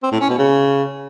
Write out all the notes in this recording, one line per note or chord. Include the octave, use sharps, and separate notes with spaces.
C4
A2
C#4
B2
C#3